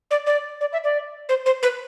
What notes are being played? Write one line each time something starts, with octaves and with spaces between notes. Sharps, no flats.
D5
D5
D5
E5
D5
C5
C5
B4